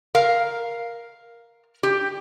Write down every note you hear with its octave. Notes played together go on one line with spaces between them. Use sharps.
A#4 F5
G4